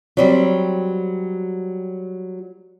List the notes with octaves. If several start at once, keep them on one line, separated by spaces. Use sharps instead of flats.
F#3 G3 C4